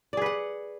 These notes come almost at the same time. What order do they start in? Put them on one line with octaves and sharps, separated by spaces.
D5 G#4 B4 F#5